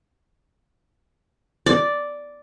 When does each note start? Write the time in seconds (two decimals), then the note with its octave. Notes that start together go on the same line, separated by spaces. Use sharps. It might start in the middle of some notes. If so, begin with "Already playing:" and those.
1.66 D5